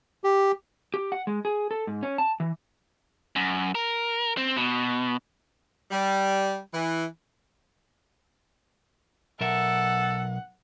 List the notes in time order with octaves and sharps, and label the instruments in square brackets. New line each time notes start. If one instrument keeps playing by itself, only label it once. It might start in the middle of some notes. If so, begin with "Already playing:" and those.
[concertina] G4
[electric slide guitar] G4
F#5
G#3
G#4
A4
G#2
C#4
A5
E3
[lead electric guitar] F#2
A#4
C4
B2
[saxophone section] G3
E3
[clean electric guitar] B1 A#4 E5 [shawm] A4 [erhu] F#5